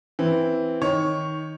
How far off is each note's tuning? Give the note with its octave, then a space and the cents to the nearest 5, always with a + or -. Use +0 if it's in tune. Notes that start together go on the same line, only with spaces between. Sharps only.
E3 +0 C4 +0
D#3 +10 D#4 +0 C#5 +0